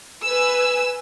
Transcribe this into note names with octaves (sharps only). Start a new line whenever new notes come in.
B4 G#5 E6